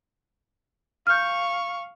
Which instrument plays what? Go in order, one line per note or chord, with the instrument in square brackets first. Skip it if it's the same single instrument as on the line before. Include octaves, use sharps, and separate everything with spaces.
[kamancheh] F5 C#6 [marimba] F6 G6